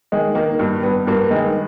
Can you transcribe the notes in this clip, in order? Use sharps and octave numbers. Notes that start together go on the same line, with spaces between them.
D#3 G#3
D#3 A#3
G2
G2 B3
G2 A#3
D#3 G#3